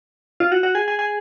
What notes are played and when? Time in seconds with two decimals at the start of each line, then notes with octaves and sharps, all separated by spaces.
0.40 F4
0.52 F#4
0.63 F#4
0.75 G#4
0.88 G#4
0.99 G#4